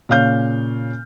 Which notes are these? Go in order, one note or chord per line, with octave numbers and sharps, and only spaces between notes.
A#2 C#3 C#5 F5 F6 G6